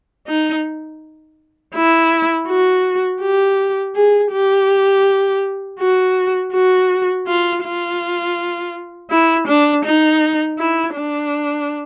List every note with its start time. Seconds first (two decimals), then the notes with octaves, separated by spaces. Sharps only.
0.27 D#4
1.74 E4
2.48 F#4
3.21 G4
3.95 G#4
4.32 G4
5.79 F#4
6.54 F#4
7.27 F4
7.63 F4
9.10 E4
9.47 D4
9.85 D#4
10.58 E4
10.95 D4